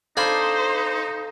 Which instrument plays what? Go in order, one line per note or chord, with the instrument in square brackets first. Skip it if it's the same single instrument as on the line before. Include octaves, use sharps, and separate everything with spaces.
[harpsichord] D4 G#5 B5 [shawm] D#4 [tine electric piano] A4 F5 [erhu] C5